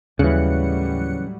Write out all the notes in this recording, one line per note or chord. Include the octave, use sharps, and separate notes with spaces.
D#2 A2 C#3 E3 F#3 G3 F#6 C#7